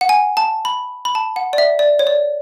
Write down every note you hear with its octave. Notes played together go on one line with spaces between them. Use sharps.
F#5
G#5
A5
B5
B5
A5
F#5
D5
E5
D5
C#5
D5